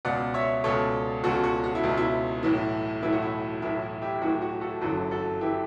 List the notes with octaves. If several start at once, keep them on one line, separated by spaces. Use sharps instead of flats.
C#2 B2 D5 F#5
C#5 E5
C#2 B2 A4 C#5
C#2 B2 F#4 A4
F#4
F#4
E4
C#2 B2
E4
B1 A2 E3
B1 A2 E3 E4
F#4
E4
B1 A2 E3 E4
E4
E4 G4
B1 A2 E3 F#4
F#4
F#4 A4
G1 F#2 E3 F#4 A4
F#4 A4
E3 E4 G4